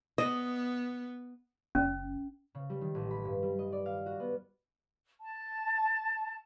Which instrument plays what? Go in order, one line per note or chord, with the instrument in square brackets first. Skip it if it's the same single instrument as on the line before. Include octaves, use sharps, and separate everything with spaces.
[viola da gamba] B3 [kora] D#5
[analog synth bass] F#1 [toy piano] C#4
[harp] C#3
G3
D#3
A1
B5
G2
G3
D#5
D5
F5
F#4
B3
[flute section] A5